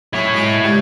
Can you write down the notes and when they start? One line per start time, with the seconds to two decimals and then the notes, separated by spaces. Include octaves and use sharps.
0.13 F#3 C#4 E4 C#5
0.34 G#3 F#4 G#4
0.64 C#2 G#2 G3